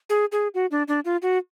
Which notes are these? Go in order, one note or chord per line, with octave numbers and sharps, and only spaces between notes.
G#4
G#4
F#4
D4
D4
F4
F#4